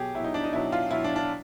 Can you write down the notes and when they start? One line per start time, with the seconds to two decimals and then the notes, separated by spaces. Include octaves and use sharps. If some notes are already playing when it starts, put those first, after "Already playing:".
Already playing: B2 F#3 G4 G#4
0.15 B2 F#3 E4
0.24 D#4
0.34 D4
0.44 D#4
0.53 B2 F#3 E4
0.72 F4
0.91 B2 F#3 E4
1.04 D4
1.16 D4